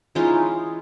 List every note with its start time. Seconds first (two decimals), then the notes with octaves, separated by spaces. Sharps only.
0.15 E3 G#3 C#4 D#4 F4